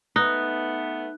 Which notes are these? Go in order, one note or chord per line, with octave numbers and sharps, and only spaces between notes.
A3 B3 D#4 F#6